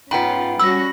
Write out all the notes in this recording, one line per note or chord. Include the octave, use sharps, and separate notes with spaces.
G#2 B3 C#4 F4 G5 B5
G3 C#4 F#4 B5 E6 A#6